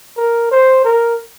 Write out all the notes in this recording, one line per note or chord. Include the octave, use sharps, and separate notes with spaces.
A#4
C5
A#4